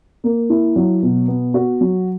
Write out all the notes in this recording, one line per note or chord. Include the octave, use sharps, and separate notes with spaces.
A#3
E4
F#3
B2
B3
F#4
F#3